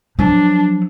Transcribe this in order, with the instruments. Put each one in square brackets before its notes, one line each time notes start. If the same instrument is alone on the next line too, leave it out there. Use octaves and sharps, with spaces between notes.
[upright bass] F3 F#3 [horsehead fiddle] D4